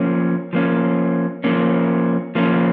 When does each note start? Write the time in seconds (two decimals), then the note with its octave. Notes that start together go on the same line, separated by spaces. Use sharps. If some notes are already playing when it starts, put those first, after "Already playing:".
Already playing: F3 A#3 C#4
0.53 F3 A#3 C#4
1.44 F3 A#3 C#4
2.35 F3 A#3 C#4